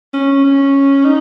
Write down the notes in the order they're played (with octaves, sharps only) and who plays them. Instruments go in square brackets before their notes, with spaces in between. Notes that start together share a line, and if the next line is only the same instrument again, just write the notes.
[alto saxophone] C#4
C#4
D#4